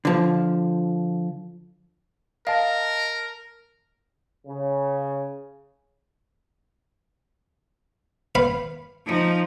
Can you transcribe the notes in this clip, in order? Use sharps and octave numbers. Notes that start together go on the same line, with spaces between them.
D3 F3
A#4 D#5 F5 A5
C#3
B4 F5 B5
F3 D#4